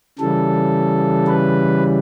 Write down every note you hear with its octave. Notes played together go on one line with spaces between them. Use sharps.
C#3 E3 G3 A4
B4